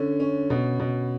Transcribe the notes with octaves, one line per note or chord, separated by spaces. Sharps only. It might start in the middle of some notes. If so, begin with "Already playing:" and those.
Already playing: D3 C#4
C#4
B2
B2